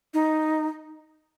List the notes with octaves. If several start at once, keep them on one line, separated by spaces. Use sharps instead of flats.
D#4